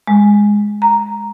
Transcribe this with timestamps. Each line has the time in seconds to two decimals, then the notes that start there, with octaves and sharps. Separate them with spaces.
0.08 G#3
0.82 A#5